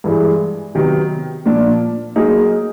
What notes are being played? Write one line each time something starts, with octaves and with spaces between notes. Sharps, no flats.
G2 E3 G#3
C3 D#3 F#3 B3
A#2 F3 A#3 D4
F#3 A#3 D#4 G#4